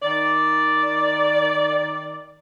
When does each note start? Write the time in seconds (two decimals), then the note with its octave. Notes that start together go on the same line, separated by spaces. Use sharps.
0.03 D#3 D5